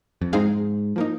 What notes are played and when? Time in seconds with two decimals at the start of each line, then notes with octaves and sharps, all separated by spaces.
0.21 F2
0.32 G#2 G#3 C4 D#4 G#4 F5
0.96 F3 A#3 D#4